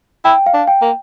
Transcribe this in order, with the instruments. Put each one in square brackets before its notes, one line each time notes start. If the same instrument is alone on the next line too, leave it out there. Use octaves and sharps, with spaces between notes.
[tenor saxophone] E4 [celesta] G5
[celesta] F5
[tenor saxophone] D4
[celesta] G5
[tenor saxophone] A#3